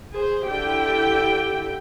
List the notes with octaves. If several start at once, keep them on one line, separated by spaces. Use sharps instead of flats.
G#4 C5
D3 E4 G4 G5